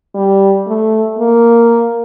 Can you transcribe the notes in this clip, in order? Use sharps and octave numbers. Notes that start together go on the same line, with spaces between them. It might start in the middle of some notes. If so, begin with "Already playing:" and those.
G3
A3
A#3